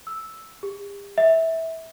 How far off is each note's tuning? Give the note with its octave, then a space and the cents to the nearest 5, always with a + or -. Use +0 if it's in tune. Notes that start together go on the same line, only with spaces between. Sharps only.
E6 -5
G4 +45
E5 -15